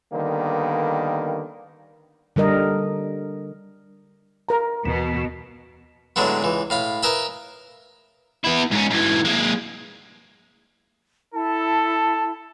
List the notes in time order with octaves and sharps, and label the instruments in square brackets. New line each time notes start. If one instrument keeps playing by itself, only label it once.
[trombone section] D3 D#3 G3 A#3 B3
[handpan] D3 G3 A#4 D#5
[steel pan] A#4 A#5
[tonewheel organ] D#2 E3 [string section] B2
[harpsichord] A2 D3 F#3 G#3 A3 B3
C#2 E3
A2 F5 B5
A#4 B4 D#5 E5 G#5 B5
[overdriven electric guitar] B3 E4
G#2 C#4
G#2 E3
G#3 A#3
[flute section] E4 A5 [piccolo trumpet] A4